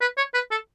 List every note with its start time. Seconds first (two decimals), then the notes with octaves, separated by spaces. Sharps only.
0.01 B4
0.17 C#5
0.34 B4
0.51 A4